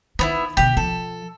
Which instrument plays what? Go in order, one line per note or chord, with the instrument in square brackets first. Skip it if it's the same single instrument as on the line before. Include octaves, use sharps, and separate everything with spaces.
[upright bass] D#3 [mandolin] B3 D4 E4
[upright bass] B2 D3 [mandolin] G4
[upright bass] F3 [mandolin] A4